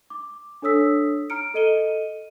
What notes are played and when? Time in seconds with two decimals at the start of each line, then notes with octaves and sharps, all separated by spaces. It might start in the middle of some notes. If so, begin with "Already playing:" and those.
0.10 D6
0.62 D4 A4 C#5 D#6 E6 B6
1.30 A#5 F6 C#7 D7
1.54 A4 D#5 D#7 G7